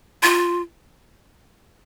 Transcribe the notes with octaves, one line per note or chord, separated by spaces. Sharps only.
F4